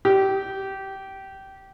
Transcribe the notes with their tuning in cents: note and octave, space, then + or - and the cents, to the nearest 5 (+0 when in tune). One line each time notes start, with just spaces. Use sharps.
G4 -20